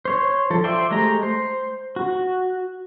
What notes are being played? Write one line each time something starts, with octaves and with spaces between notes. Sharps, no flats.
C5 C#5 C6
F3 A4
C5 D5 E5 G5
G#3 A3 G4 A#5
C5
F#4